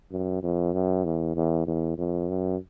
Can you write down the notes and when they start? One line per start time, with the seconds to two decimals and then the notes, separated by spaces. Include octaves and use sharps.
0.11 F#2
0.43 F2
0.74 F#2
1.05 E2
1.36 E2
1.67 E2
1.98 F2
2.29 F#2